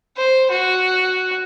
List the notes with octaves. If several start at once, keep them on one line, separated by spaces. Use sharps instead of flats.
C5
F#4